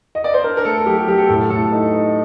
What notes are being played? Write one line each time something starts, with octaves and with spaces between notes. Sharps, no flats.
D#5
D5
C5
D4 A#4
A#4
A3 A4
A4
F#3 G4
G4
F#3 G4
A4
A2 A4
A2 A4
D#4
D#4